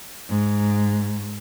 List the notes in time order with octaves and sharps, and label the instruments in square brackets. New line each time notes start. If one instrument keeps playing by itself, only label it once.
[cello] G#2